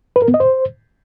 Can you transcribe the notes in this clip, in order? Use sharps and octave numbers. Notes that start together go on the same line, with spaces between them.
B4
A#4
B3
D#5
C5